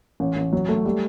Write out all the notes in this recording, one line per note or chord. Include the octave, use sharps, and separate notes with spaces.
A1
A1
F#3
A3
G3